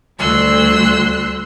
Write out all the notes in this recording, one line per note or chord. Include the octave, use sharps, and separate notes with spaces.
D2 G3 C6 E6 F#6